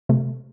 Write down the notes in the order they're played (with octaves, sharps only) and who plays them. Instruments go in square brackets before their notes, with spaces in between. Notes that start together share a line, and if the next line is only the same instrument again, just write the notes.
[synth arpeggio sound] C3 A3